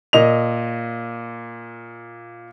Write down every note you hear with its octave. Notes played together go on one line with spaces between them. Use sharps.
A#2 D#5 F7